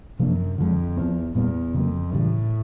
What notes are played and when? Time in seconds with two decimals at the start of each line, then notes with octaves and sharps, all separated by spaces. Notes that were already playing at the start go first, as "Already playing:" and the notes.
0.20 F#2 C3 F3 A#3 D4
0.58 F2 D3 F3 G#3
0.97 E2 F3 G#3 C4
1.35 E2 A#2 G3 B3
1.74 F2 C#3 F#3 A#3
2.13 A2 C#3 E3 G3